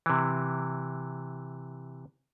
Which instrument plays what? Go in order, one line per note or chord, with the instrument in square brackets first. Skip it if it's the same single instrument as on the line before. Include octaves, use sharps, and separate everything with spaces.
[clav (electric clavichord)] C3 E3